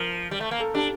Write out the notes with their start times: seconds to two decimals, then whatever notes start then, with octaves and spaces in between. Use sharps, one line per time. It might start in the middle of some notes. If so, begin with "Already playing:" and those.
Already playing: F3 A#4
0.31 G3
0.41 A3
0.51 A#3
0.60 A4
0.74 D4 G4